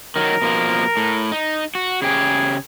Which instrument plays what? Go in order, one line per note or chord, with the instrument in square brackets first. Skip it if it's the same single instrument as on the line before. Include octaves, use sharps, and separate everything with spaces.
[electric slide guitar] D#3 F#3 [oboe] A#4
[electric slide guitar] B2 F3 A#3
A2
D#4
F#4
[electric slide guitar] C#3 G4 [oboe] G#4